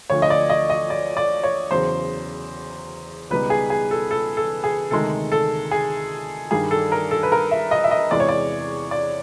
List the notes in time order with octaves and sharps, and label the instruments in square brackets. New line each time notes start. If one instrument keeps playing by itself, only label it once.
[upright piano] D2 D3 F3 C#5
D#5
D5
D#5
D#5
D5
D5
C#5
E2 C#3 F#3 C5
C#2 B2 G3 B3 D#4 B4
G#4
G#4
A4
A4
A4
G#4
D2 C3 D#3 G#3 A4
A4
G#4
G2 D#3 G3 G#4
A4
A#4
A4
B4
A#4
E5
D#5
E5
D#5
E2 C3 E3 G#3 D5
C#5
D5
D5